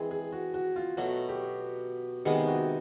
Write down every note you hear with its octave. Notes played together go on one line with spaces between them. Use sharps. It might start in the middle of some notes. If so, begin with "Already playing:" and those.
Already playing: E3 G#3 C4 G#4
G#4
F#4
F#4
F4
B2 F#3 A3 F#4
G4
C3 D#3 G#3 B3 G#4
F#4